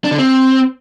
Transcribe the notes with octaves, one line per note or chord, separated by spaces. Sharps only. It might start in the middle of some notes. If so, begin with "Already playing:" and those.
D4
D3
C4